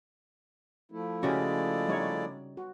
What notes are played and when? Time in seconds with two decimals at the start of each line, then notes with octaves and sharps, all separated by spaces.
0.92 F3 A3 E4
1.23 C#3 G#3 C#4 F#4 G4 D5
1.89 G3 D#4 C#5
2.57 F#4